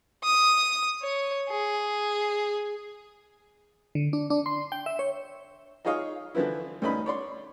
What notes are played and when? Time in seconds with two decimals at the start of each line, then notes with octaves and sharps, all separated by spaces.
0.24 D#6
1.03 C#5
1.50 G#4
3.95 D3
4.13 D4
4.30 D4
4.46 C6
4.72 G5
4.86 E5
4.99 C#5
5.85 D#4 F4 G#4 C#5 D#5 F5
6.35 D3 E3 F3 B3 E4
6.82 D2 B3 C#4 D#4 B5
7.06 C#5 D5 C6